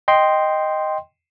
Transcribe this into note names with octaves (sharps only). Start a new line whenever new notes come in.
D#5 G5 C6